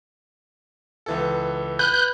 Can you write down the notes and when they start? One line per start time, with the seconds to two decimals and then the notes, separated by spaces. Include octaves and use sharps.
1.06 C#2 E3 A4
1.79 B4 F#6 G6